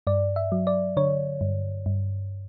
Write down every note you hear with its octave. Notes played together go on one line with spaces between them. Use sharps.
G2 D5
E5
F#3
D5
D3 C#5
G2
G2